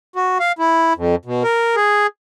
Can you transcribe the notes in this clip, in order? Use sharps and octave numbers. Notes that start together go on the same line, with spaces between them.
F#4
F5
E4
F2
B2
A#4
G#4